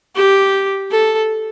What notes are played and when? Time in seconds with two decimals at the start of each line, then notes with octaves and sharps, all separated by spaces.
0.15 G4
0.91 A4